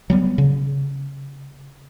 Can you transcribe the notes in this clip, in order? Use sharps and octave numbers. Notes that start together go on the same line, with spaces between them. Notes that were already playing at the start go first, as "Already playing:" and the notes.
F#3 G3 B3
C#3